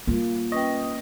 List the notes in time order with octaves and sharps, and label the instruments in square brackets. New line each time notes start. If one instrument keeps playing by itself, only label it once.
[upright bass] G3 F4 [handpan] A#3
[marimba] C#4 B4 G5 [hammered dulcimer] D#5